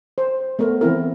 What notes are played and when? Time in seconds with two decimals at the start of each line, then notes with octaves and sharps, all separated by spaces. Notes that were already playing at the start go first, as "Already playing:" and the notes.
0.18 C5
0.59 A3 B3 A#4
0.81 E3 C4 E4 A#4